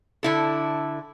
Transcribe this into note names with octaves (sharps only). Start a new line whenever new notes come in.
D3 E4 A4